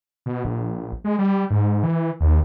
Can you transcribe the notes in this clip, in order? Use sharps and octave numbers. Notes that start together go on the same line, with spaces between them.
B2
A#1
G#3
G3
G#2
E3
D#2